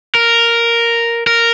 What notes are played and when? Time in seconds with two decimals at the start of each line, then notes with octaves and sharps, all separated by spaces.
0.15 A#4
1.27 A#4